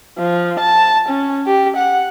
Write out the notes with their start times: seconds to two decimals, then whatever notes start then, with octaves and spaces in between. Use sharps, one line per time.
0.19 F3
0.60 A5
1.09 C#4
1.47 G4
1.77 F#5